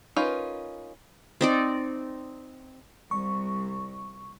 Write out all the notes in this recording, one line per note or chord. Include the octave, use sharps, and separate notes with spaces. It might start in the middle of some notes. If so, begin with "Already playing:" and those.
C#4 D#4 F4 A#4 B4
C4 D#4 D5
C2 C#6